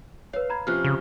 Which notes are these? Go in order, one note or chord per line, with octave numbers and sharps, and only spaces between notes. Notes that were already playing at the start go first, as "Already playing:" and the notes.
B4 C#5 F5
A#5 B5 G#6
C3 F3 C#4 F6 F#6
C#3